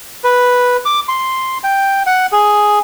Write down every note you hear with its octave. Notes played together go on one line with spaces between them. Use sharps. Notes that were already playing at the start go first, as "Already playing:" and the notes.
B4
D6
C6
G5
F#5
G#4